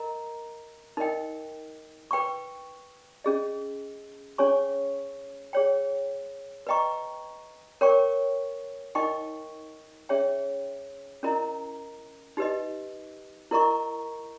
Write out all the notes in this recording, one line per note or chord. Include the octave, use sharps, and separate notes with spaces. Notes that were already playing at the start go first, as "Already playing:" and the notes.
Already playing: A#4 D#5 A#5
D#4 A#4 D#5 G5
B4 G5 C#6
C#4 G#4 D#5
C#4 G#4 C#5 G#5 C#6
G#4 C#5 G5
B4 D#5 G5 A#5 C#6
A#4 C#5 G5 C#6
D#4 A#4 D#5 G5 C#6
C#4 G#4 C#5 E5 G5
C#4 E4 A#4 D#5 A#5
D#4 G4 B4 D#5
E4 A#4 D#5 A#5 C#6